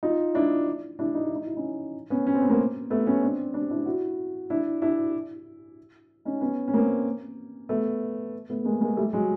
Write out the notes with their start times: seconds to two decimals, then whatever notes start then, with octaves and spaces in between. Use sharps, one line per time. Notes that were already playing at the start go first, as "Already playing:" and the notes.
0.03 D#4 F4
0.35 D4 E4
0.99 D4 E4
1.15 D#4
1.25 E4
1.35 D#4
1.46 E4
1.57 C#4 D#4
2.10 B3 C#4
2.27 C#4
2.34 C4
2.41 B3
2.50 A#3 C4
2.90 A3 B3
3.06 B3 C#4
3.22 C4 D4
3.54 C4 D4
3.70 D4 E4
3.86 E4 F#4
4.50 D4 E4
4.82 D4 E4
6.25 C#4 D#4
6.41 B3 C#4
6.68 C#4
6.73 A#3 C4
7.69 A3 B3
8.50 A3 B3
8.65 G#3 A#3
8.81 G#3 A#3
8.97 G3 A3
9.13 F#3 G#3